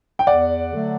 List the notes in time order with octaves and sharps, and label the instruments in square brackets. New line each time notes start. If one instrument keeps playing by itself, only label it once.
[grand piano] G5
[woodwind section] E2 [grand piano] D5 F#5
[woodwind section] D3 F#3 A3